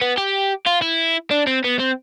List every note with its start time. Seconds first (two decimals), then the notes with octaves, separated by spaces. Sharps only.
0.02 B3
0.18 G4
0.67 F4
0.82 E4
1.31 D4
1.47 C4
1.64 B3
1.79 C4